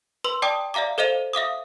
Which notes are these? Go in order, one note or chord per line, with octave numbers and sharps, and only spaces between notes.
B4 C6 E6
D5 G5 A5 D6 D#6
D5 E5 F5 A#5 D6
A4 C5 D#5 F5 D#7 F7
E5 F5 D6 D#6